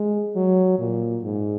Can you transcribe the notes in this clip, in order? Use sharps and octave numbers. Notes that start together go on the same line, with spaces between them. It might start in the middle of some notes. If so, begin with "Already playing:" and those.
Already playing: G#3
F#3
A#2
G#2